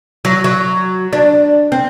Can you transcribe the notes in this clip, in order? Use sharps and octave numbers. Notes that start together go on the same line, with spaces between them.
F#3
F#3
D4
C4